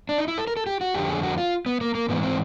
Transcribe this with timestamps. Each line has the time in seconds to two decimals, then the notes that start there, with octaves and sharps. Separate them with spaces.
0.09 D4
0.18 D#4
0.28 E4
0.38 A4
0.47 A#4
0.57 A4
0.67 G4
0.81 F#4
0.95 F2 D3 G4
1.09 G#4
1.23 F#4
1.38 F4
1.66 B3
1.81 A#3
1.95 A#3
2.09 G#2 E3 B3
2.23 C4